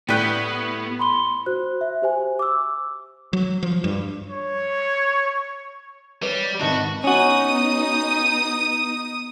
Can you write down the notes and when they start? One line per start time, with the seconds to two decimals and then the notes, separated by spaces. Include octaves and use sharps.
0.08 A2 G3 B3 B4 G5
0.99 B5 C6 G7
1.46 F#4 C5 F#6
1.81 E5
2.02 G4 C5 G#5
2.39 D6 E6
3.33 F#3
3.63 F3
3.84 G2
4.30 C#5
6.22 G3 B4 C#5
6.60 G#1 F#4 D#5 A5
7.04 B3 C#4 D#4 F#4 D#6